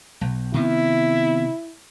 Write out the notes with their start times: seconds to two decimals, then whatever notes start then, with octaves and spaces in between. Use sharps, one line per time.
0.21 B1
0.54 C3 D#3 B3 E4